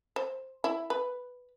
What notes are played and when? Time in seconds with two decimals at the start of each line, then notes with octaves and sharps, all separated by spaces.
0.16 C5
0.64 E4
0.90 B4